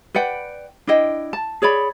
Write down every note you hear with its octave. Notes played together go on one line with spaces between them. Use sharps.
B4 D5 F#5 G5
D4 E4 D#5 G5
A5
G#4 C#5 D5 B5